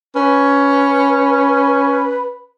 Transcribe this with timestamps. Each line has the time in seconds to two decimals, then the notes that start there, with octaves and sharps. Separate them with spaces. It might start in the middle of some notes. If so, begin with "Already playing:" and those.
0.16 C#4 B4